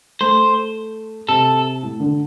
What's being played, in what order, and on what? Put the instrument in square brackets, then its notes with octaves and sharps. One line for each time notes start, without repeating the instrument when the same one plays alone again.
[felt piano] A3 [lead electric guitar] C5
[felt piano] C3 [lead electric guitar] A4
[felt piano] A2
D3